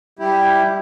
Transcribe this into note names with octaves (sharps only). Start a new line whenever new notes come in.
G3 E4 G4